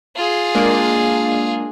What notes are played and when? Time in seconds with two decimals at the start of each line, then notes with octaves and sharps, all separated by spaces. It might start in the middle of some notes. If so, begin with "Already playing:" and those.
0.16 F4 G#4
0.55 G#3 A#3 D4